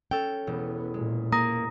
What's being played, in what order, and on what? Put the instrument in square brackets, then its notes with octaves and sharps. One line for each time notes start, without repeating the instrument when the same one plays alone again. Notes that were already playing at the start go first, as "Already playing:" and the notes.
[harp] C#4 A4 [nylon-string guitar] G5
[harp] E1 [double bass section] B3
[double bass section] A#2 [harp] G#3
[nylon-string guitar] A#3 [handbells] A#5 D#6 A#6